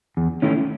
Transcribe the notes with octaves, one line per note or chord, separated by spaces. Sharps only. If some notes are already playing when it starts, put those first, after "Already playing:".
E2
D#3 A3 C#4 E4